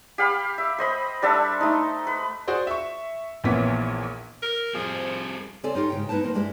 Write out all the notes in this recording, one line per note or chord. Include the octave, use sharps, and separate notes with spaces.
G4 F5 B5
E5
C5 D#5 B5
G3 D4 A4 E5
A3 D#4
B4
F#4 G#4 C5 D5
E5 C#6
A#1 A#2 E3 B3 C#5 B6
A#4
F3 G3 C4 G#4
C#3 C4 A4 D5 G#5 A5
D#4 F4 G4 C#5
G#2 C#3 G5
B3 D#4 E4 B4 C5 A5
E3 A#3 C4
G2 G3 G#3 E4